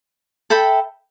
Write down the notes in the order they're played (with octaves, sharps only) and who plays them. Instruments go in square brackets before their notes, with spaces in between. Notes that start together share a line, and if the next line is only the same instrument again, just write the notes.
[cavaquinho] A4 E5 G5 B5